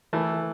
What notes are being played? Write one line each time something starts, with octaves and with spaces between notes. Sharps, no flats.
E3 A3